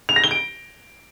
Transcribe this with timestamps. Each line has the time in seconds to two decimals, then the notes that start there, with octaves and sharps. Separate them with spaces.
0.09 F7
0.16 A#6
0.24 G7
0.31 D7